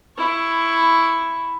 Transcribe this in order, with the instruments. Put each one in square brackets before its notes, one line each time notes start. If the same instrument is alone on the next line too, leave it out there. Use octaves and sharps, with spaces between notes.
[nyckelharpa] E4 C#6